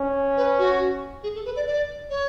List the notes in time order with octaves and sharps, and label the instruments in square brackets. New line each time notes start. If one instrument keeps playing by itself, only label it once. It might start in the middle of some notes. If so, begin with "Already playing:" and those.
Already playing: [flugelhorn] C#4
[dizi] B4
F#4
G#4
A4
B4
D5
D5
C#5